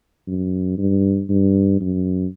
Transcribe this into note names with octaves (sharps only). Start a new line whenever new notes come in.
F#2
G2
G2
F#2